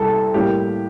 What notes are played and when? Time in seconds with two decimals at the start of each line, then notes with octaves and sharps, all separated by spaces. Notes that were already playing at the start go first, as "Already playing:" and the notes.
Already playing: C2 C3 G3 A4
0.34 A2 G3 A#3 G4